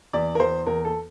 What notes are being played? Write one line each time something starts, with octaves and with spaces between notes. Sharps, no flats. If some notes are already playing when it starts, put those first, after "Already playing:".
E2 D5
A#4
E2 C5
E2 A#4
A4